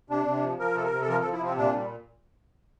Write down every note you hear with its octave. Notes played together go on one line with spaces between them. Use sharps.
C3 D4
C3
F3
F3 A#4
C3 A4
A#4
C3
A4
F3 A#4
A4
F3
E4
C3 C4
A#2 D4
G3